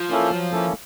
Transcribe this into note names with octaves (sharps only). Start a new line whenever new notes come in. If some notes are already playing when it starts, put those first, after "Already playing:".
Already playing: F3
A#3 C#4 E4 A4
F#3
A#3 C#4 E4 A4